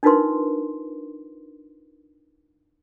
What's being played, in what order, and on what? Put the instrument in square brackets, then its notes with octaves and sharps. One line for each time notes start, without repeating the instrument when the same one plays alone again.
[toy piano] D4 D#4 F4 A#4 B4 C6